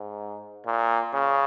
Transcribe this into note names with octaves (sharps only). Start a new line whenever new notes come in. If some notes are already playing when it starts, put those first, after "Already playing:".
Already playing: G#2
A#2
C#3